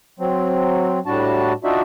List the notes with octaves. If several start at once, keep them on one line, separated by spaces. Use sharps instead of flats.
F#3 C4
A2 G3 D4 F#4 A5
D4 D#4 F4 F#4 D5 E5